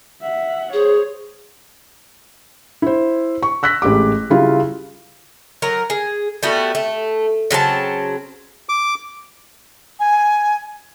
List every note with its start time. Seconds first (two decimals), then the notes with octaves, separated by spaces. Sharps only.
0.22 E5 F#5
0.73 G#4 C5 C#5
2.82 E4 C5
3.43 C#6
3.63 E6 F#6 A#6 B6
3.82 A1 G#3 G4 D6
4.30 C#3 G3 E4 F4
5.62 F#3 A#4 A#5
5.90 G#4
6.43 G3 A3 B3 F#4
6.75 A3
7.51 C#3 F#3 C4 A5
8.69 D6
10.00 G#5